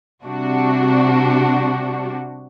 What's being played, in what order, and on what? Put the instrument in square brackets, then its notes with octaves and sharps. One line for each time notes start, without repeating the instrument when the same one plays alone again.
[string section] C3 G3 D4 F#4